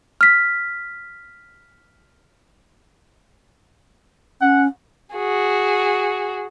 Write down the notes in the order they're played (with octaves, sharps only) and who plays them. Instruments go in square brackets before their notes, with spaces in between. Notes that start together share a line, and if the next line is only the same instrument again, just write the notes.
[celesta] F6 B6
[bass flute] C#4 [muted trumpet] F#5
[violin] F#4 G#4